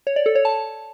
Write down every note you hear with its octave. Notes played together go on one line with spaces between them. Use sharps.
C#5
D5
A4
C#5
A5